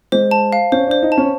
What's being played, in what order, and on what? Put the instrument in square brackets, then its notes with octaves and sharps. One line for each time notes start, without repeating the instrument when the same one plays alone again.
[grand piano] G#3 [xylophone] C5
[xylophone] A5
F5
[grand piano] C#4 [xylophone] C5
[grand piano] D4 [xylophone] C5
[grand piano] D#4
[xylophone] A5
[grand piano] C#4